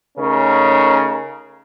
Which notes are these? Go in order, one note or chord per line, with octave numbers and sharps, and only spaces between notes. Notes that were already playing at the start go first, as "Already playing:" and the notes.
C#3 A3 C#4 D#4 A#4